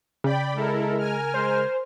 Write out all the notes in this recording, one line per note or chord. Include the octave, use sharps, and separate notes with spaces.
C#3 D5 G5 B5
G#3 E4 A4 A#4
A#4 G#5 F6
G#3 C5